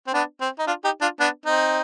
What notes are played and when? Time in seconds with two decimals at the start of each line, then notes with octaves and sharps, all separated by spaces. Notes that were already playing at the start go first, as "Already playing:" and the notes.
0.07 C4
0.14 B3 D4
0.40 C4
0.59 D#4
0.67 D4 F4
0.84 D#4 G4
1.01 D4 F4
1.20 B3 D4
1.45 C4 D#4